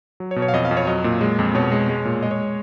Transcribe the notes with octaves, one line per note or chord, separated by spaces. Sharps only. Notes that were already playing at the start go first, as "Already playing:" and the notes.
F#3
C#5
B2
C#5
F5
F2 D#5
F5
F2
C#5
F#3 D#5
A#2
G#3
F2
B2 C#5
G#3
G#3
A#2
G#3 D#5
C#5